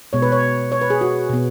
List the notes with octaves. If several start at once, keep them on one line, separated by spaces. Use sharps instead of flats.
B2 G#3 B3 C#5
B4
C#5
C#5
B4
G#4
F#4
B2 B3